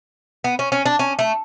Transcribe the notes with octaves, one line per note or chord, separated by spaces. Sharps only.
B3
C#4
C#4
D4
C#4
A3